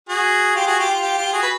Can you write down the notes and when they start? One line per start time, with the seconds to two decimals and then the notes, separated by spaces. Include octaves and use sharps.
0.09 F#4 G#4
0.55 F4 G4
0.67 F#4 G#4
0.80 F4 G4
0.90 F4
1.02 F4 G4
1.18 F4 G4
1.33 F#4 G#4
1.43 B4